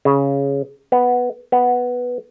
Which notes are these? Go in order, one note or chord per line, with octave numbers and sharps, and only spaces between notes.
C#3
B3
B3